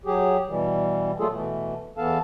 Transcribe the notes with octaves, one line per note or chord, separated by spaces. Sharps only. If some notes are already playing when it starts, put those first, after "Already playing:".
F#3 G4 G#4
B2 E3 G3
A#2 F#3 A3 F4 G#4 A4
B2 E3 A3
E2 E3 B3 A4 F5 A5